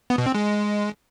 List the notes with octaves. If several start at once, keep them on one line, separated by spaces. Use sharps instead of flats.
B3
B2
C4
G#3